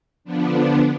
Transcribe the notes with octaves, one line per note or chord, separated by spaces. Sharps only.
D3 F3 B3 D4